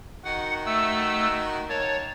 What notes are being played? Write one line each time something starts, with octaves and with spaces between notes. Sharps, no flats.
D#3 F#4 F#5
A3 E6
D#3 A#3 C#5 A5